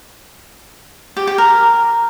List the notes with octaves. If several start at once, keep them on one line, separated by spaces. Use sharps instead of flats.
G4
G4
A#4